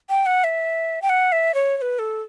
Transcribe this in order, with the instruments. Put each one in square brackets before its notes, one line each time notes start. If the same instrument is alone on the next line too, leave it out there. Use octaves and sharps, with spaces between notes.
[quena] G5
F#5
E5
G5
F#5
E5
C#5
C#5
B4
A4